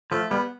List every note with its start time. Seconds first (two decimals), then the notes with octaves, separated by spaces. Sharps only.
0.11 F3 A3
0.30 G3 B3